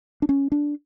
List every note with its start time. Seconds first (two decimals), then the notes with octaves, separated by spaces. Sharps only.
0.22 D4
0.29 C#4
0.52 D4